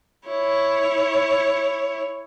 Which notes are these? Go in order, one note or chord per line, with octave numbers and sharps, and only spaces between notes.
E4 C#5